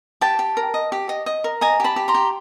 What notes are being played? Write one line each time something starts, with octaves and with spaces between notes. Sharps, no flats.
G4 G5 A5
G4
A#4
D#5
G4
D#5
D#5
A#4
D#5 G#5 A#5
G4 A5 B5
G4
A#5 C6
G4